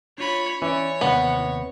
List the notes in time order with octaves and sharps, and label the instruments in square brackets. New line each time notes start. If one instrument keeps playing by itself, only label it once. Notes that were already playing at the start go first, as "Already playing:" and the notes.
[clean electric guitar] D4 F4 [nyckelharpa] C#5 B5
[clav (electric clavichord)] E3 [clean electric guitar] C#4 D5 [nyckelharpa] C#5
[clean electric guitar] D#2 C3 F#5 [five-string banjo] B3